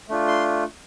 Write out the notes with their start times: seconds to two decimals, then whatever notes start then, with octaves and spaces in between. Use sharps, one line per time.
0.09 A3 D4 F4
0.28 C6